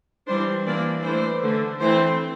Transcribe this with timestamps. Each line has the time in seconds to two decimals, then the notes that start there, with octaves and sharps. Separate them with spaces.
0.28 E3 G3 D4 C5
0.66 E3 A#3 D4 D5
1.03 E3 A3 D4 C5
1.42 D3 A3 D4
1.80 E3 A3 C4 C5